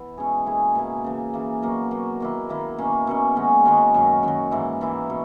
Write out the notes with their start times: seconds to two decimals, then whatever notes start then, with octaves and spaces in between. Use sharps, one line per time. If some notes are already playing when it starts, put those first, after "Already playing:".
Already playing: E3 B3 E4
0.17 B2 G#3 C#4 G#4
0.46 B2 A#3 E4 G#4
0.75 B2 A#3 E4 G#4
1.04 C#3 E3 A#3
1.34 C#3 E3 A#3
1.62 B2 F#3 A#3
1.91 B2 F#3 A#3
2.20 D#3 A#3 E4
2.49 D#3 A#3 E4
2.78 B2 A#3 C#4
3.07 B2 A#3 C#4
3.36 D#3 G#3 C#4 F#4
3.65 D#3 G#3 C#4 F#4
3.94 F#2 D#3 F#3
4.23 F#2 D#3 F#3
4.51 G#2 E3 A#3 E4
4.81 G#2 E3 A#3 E4
5.10 B2